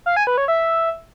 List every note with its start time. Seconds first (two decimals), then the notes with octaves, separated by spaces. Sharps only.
0.06 F5
0.16 G#5
0.27 B4
0.38 C#5
0.48 E5